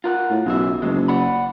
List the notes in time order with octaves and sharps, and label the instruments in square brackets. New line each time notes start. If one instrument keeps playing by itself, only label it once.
[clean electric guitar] F4 A#4 F#5
[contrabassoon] A2
[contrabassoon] B1 [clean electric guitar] C#3 E3 E5
[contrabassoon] F#1 [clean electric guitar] B2 F#3 G#3
[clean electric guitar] D5 F#5 B5